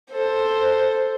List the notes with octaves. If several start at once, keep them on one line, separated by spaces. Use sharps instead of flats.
A4 C5